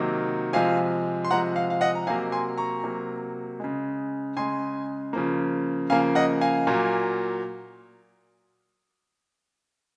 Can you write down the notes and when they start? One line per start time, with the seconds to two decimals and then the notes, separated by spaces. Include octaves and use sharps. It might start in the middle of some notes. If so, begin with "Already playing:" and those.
Already playing: C3 D#3 F#3 A#3
0.53 C3 F3 G#3 F5 G#5
1.25 C6
1.31 C3 F3 G#3 F#5 A#5
1.56 F5
1.70 F5
1.81 D#5 F#5
1.95 A#5
2.07 C3 F#3 A#3 F5 G#5
2.32 G#5 C6
2.58 A#5 C#6
2.84 C3 F#3 A#3
3.60 C#3 G#3
4.37 C#3 G#3 G#5 C6
5.13 C#3 F3 A#3
5.90 C#3 F3 A#3 F5 G#5
6.15 D#5 F#5
6.41 F5 G#5
6.67 A#2 F#3 A#3